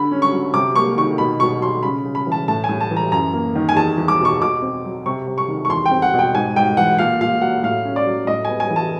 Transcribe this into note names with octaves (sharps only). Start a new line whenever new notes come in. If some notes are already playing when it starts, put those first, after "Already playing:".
Already playing: D3 B5
C#4
C#6
F#3
C3 D6
A#3 C#6
D#3 C#6
B2 B5
B2 C#6
F#3 C6
C#3 B5
C#3
B5
E3 A5
A2 A5
G#5
A2
A5
E3
A#5
F#2 A#5
A#3
D#3
G#5
E2 A5
E2
D6
B2
C#6
B2 D6
C4
F#3
C3 C#6
C3
C#6
D#3
C#6
E2 C6
G5
C4
F#5
B2
G5
G#2 G#5
G#2 G5
E3 F#5
A#2 F5
A#2 F5
F#3 F#5
A2 F5
C#4
D5
F#3
A2 D#5
B3 G#5
G#5
E3
A5